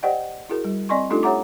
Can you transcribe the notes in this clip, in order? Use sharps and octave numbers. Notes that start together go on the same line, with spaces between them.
G4 C5 D5 D#5 F#5 G5
E4 F#4 G#4 A#4
G3
C4 D5 D#5 G#5 C6 C#6
A3 D4 D#4 F4 G4 A4
G4 C#5 E5 F#5 A#5 D6